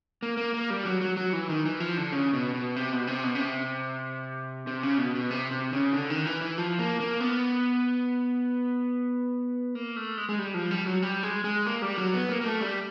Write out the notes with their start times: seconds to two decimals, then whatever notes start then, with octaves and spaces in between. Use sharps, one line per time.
0.23 A#3
0.37 A#3
0.54 A#3
0.70 G3
0.85 F#3
1.01 F#3
1.17 F#3
1.33 E3
1.49 D#3
1.65 E3
1.80 F3
1.97 D3
2.13 C#3
2.33 B2
2.54 B2
2.76 C3
2.92 B2
3.07 C3
3.24 B2
3.35 C#3
3.40 C3
4.67 C3
4.83 C#3
4.98 B2
5.15 B2
5.31 C3
5.51 C3
5.73 C#3
5.93 D3
6.10 D#3
6.26 E3
6.41 E3
6.58 F3
6.79 A#3
7.00 A#3
7.20 B3
9.75 A#3
9.96 A3
10.18 G#3
10.29 G#3
10.39 G3
10.54 F3
10.71 G3
10.86 F#3
11.03 G3
11.23 G#3
11.44 G#3
11.65 A#3
11.82 G3
11.98 F#3
12.14 B3
12.30 A#3
12.41 A#3
12.45 A3
12.61 G3